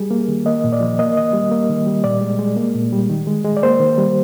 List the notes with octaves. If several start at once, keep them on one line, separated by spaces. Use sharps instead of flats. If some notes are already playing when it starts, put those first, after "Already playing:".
Already playing: G3 G#4
A#3
D#3
A#3 D#5
A#2
D5
F3
A#3 D#5
D#3 D#5
G3
A#3
D#3
G3
A#2 D5
G#3
G#3
A#3
A#2
G3
D#3
G#3
G#3
D5
A#3 C5
D#3
G3